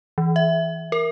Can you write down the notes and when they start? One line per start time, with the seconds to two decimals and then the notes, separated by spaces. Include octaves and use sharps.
0.18 E3
0.36 E5
0.92 A#4